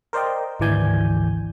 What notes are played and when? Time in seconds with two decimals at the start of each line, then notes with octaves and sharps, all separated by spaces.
0.13 A#4 C5 D5 D#5 G5
0.60 G#1 D2 E3 D5 G#5 G6